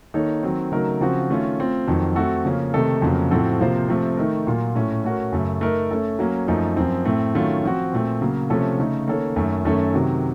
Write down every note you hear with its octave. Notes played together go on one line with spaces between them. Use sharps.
D#3 A#3 D#4 A4 C#5
D#3 F#3 C4
C#3 F#3 A3 D#4 A#4
C#3 F3 C4 F#4
D#3 A3 C#4 F4
A3 C4 F4
F2 D#3 F#3
A3 C4 F#4 A4
C#3 F3 A#3 C#4
C3 D#3 A3 D#4 A4
F2 C#3 F#3 A#3
A2 F3 C4 F#4 A4
C3 F3 A#3 F4 C5
C3 F3 A3 C4
D#3 A3 D#4 A#4
A#2 F#3 A#3 F4
A2 A3 C#4
A3 C#4 F#4 A#4
F#2 C#3 A3
A3 D#4 A#4
A3 C#4 A4
F#3 A#3 C#4
F#2 F3 A3 D#4
F#2 F3 C4
A2 A3 C4
D#3 F#3 A3 C#4 F4
F3 C4 F#4
A#2 A3 C4
C#3 F#3 A#3
C3 F3 A3 C#4 A4
C#3 A3 D#4
D#3 A#3 C#4 A4 C#5
F#2 D#3 A3 C#4
F#2 D#3 A3 C#4 A4
C3 D#3 F#3